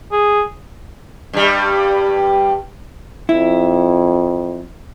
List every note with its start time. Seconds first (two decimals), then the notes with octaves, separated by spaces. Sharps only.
0.12 G#4
1.33 G2 G3
3.29 F2 E4